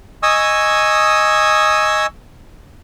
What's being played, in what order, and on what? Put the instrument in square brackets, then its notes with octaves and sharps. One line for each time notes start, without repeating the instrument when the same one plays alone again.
[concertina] D#5 G#5 C#6 D#6 E6